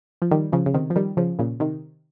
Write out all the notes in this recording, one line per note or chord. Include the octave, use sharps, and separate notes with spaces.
F3
D#3 G3
C#3 F3
C#3
C3 D#3
F3
D#3 G3
C#3 F3
A#2 C#3
C3 D#3